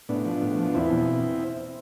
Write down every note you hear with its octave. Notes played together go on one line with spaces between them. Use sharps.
A2 B3 D4
F3
A2
F3
E2 C4 E4
B2